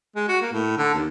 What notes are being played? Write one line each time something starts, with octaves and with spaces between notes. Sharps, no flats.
G#3
F#4
A#3
A2
D3
D#2